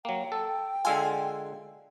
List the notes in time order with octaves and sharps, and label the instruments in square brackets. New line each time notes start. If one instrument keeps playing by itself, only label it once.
[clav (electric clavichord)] F#3 A#3 [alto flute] G5
[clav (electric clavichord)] A4
[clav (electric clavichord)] D3 G#3 F4 [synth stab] G#5 E6 G#6